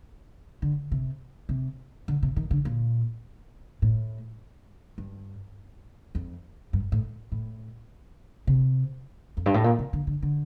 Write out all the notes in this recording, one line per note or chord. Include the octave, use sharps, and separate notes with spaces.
D3
C3
C3
D3
C3
D#3
D3
A#2
A2
G2
F2
G2
A2
A2
C3
F2
G2
A2
A#2
C3
D3
D3
D3